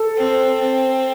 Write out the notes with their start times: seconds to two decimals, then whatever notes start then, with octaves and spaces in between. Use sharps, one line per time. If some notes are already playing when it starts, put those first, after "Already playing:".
Already playing: A4
0.17 C4
0.60 C4